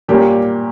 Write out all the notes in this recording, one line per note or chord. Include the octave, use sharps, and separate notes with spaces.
A#2 G3 A#3 C#4 G4